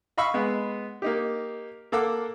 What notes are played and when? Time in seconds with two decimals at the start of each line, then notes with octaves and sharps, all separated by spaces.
0.18 D#5 F5 B5 C#6 E6
0.34 G#3 B3
1.02 A#3 D#4 G4
1.92 A#3 A4 F5 F#5 D6 E6